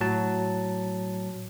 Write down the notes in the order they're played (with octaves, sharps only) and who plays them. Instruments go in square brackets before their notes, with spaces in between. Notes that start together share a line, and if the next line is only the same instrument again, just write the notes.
[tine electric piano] A2 F#3 A5